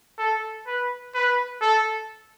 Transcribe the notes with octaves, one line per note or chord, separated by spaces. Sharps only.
A4
B4
B4
A4